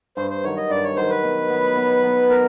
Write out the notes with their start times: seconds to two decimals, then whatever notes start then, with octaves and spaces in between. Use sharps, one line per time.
0.17 G2 C5
0.31 C5
0.44 D#3 F#3 C#5
0.57 D#5
0.70 G2 D5
0.84 C#5
0.96 D#3 F#3 C5
1.10 B4
1.24 B2
1.50 F#3 B3
1.77 B2
2.03 F#3 B3
2.30 B2 A#4